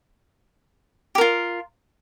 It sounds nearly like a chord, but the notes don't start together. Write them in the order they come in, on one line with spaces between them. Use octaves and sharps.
G4 A#4 F4